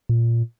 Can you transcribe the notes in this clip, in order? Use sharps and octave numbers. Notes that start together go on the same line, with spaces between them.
A#2